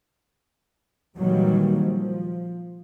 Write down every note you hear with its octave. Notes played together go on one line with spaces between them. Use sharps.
A#2 D#3 E3 F#3 G3 A#3
F3